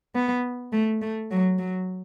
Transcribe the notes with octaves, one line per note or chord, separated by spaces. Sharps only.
B3
A3
A3
F#3
F#3